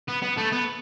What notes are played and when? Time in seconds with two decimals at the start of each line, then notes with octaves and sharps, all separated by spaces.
0.09 B3
0.23 B3
0.38 A3
0.53 B3